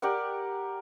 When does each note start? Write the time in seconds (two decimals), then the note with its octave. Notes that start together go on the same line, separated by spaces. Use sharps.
0.02 G4 A#4 D5 F#5